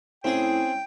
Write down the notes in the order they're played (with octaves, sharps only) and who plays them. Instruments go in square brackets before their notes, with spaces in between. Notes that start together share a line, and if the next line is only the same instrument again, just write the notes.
[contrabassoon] A2 [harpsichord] C4 G#4 [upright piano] C#4 E4 [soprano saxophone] G5